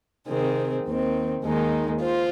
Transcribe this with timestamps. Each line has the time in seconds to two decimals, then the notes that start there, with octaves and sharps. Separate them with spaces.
0.27 C3 D#3 C4 G#4
0.84 D#2 D#3 C4
1.42 D#2 D#3 G#3 D#4
2.00 F4 C5